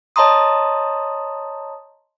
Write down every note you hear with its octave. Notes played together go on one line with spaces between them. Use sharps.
C#5 D#5 A5 A#5 C6 D#6